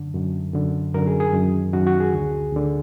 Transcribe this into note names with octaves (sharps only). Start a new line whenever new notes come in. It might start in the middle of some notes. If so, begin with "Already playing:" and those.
Already playing: F#2 D3
F#2 D3
F#2 D3
F#2 D3 A#4
G#4
G#4
F#2 D#3
F#2 D#3 F#4
F#4
G#4
D2 D3
D2 D3